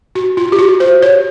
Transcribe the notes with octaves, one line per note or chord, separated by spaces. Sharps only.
F#4
F4
G4
F#4
C5
C#5